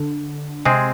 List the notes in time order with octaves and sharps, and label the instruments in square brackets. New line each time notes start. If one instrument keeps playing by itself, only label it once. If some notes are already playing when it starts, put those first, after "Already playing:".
Already playing: [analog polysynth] D3
[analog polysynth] C3 [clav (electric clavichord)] G#3 C4 G#4